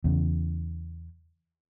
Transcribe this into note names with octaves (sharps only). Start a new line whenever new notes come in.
E2 C#3